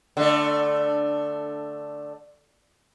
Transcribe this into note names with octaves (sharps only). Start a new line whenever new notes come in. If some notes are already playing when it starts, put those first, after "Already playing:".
D3 A3